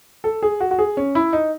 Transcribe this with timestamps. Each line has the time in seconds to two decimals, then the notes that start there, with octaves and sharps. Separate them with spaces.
0.24 A4
0.42 G#4
0.60 F#4
0.71 F#4
0.79 G#4
0.97 C#4
1.15 E4
1.33 D#4